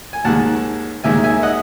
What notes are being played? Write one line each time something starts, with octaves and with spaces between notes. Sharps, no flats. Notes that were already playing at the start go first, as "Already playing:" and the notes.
G#5
D#2 D#3 G#3 F#5 A5
D#2 D#3 G#3 E5 G#5
E5 G#5
D#5 F#5